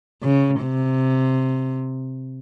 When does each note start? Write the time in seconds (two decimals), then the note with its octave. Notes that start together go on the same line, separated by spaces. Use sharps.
0.22 C#3
0.62 C3